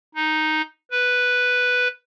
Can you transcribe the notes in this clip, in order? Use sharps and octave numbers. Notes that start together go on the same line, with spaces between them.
D#4
B4